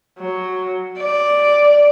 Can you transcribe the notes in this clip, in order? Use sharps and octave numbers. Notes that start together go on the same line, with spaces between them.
F#3
D5